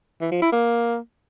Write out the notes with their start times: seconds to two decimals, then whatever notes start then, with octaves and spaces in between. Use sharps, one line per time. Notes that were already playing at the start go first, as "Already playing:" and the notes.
0.21 E3
0.31 F3
0.42 E4
0.52 A#3